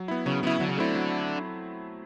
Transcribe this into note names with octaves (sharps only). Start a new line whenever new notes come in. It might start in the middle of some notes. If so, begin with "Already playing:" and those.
Already playing: F#3
B3 E4
C#3 F#3
C#3 B3 E4
D3 F#3
C#3
D3 A3 C4 E4
F#3